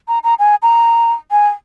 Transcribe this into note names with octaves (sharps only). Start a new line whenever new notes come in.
A#5
A#5
G#5
A#5
G#5